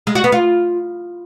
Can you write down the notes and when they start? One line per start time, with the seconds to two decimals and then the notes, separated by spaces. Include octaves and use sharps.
0.07 G#3
0.15 F#4
0.24 B3
0.32 F4